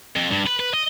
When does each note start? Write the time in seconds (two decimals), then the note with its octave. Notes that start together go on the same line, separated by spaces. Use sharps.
0.16 F2
0.31 G2
0.47 B4
0.60 B4
0.74 D#5